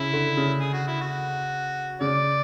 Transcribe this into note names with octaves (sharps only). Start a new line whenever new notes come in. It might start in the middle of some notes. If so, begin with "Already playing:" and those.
Already playing: C#3 E4
D3
C#3
G#4
F#4
E4
F#4
C#3 D5